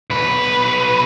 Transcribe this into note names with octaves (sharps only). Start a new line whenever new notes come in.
B1 B4